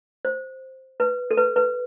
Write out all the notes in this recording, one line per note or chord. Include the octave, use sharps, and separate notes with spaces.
C5
B4
A4
B4
B4